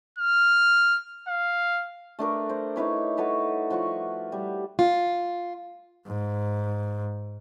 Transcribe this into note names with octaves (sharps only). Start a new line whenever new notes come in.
F6
F5
A3 D4 A#4 B4
C5
D#4 E4 B4 C#5
F#4 A4 B4 C#5
F3 F#4 D5 C#6
G3
F4
G#2